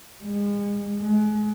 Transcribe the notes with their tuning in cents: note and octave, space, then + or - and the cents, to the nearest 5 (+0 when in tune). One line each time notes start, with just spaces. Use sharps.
G#3 -30
G#3 +35